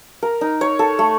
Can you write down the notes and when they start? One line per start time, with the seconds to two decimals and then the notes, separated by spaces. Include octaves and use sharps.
0.22 A#4
0.41 D#4
0.61 C#5
0.79 A4
0.99 A3